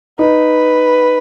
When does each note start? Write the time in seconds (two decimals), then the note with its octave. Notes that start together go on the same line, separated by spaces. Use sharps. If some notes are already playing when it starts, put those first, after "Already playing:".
0.19 D#4 B4